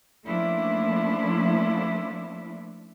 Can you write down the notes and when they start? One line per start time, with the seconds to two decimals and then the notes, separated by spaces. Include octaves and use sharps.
0.26 F3 A3 A#3 C#4 D4 E4